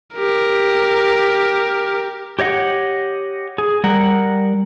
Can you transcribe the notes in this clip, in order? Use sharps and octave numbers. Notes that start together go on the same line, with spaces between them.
G4 A#4
G4 C#5 D#5 F#5
G#4
G3 A#4 F#5